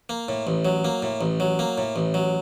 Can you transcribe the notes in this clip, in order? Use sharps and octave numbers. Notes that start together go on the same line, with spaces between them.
A#3
A2
A1
F#3
A#3
A2
A1
F#3
A#3
A2
A1
F#3